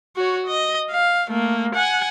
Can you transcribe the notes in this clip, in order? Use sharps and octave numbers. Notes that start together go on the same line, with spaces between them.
F#4 C#5
D#5
F5
A3 A#3
F#5 G#5